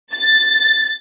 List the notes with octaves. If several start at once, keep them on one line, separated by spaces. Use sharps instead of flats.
A6